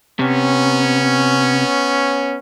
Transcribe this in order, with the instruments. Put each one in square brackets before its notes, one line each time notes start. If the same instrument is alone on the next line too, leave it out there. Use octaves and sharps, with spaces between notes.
[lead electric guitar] C3 [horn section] B3 C#4